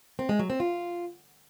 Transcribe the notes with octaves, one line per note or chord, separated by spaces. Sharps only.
C4
G#3
F#3
C4
F4